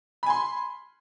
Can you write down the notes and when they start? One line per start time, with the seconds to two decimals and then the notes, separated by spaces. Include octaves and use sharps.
0.23 B5
0.26 G#5
0.30 C6